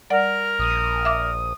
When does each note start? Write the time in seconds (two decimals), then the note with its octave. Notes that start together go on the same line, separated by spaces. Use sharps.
0.10 G3 A#4 D5 F#5
0.59 A#1 D#6
1.05 E5 D6